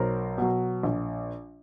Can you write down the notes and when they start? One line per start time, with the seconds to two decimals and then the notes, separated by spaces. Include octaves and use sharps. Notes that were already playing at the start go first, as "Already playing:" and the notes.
Already playing: B1 A#4 C5
0.38 B2 F#3
0.83 A#1